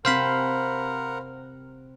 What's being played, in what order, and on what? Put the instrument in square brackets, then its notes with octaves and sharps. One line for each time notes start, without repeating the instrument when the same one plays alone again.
[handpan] C3 C4 [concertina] A#4 F#5 A#5 [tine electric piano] C5 F5 B5